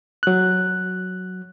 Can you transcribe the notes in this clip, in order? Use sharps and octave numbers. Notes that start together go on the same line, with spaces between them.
F#3 F#6